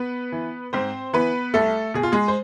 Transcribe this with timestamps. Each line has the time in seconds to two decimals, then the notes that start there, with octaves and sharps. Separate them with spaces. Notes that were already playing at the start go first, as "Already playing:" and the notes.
Already playing: B3 B4
0.32 E3
0.73 G#2 C4 C5
1.13 E3 B3 B4
1.54 C2 A3 A4
1.94 B2 G#4
2.03 F4
2.12 G#3 G#4
2.28 C5